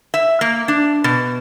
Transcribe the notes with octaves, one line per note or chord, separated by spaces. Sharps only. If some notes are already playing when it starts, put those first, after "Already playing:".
E5
A#3
D4
B2